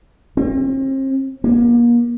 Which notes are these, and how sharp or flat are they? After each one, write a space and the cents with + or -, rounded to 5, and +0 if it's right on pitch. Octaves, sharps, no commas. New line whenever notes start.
C4 +40
A#3 +35